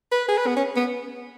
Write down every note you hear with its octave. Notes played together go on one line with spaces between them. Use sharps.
B4
G#4
B4
B3
C#4
B3